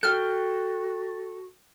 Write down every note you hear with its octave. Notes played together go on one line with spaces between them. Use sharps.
F#4 A4 G5 F6